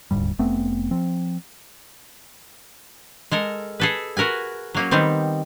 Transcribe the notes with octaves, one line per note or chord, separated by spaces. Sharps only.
D#1 D2 G#2 G3
F1 A3 B3 C4
F3 C4
G#3 A4 A#4
G#4 A4 B4
F#4 A#4 B4 G#5
F#3 A#3 C#4
D#3 G3 B3 C4